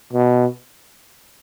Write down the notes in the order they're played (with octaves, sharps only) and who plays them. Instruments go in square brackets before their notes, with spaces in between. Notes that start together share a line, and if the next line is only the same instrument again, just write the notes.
[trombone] B2